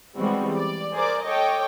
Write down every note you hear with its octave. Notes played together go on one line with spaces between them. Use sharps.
E3 G3 G#3 B3 C4 F#4
D5
G#4 A#4 C5 D5 D6
A4 C#5 D#5 G5 D6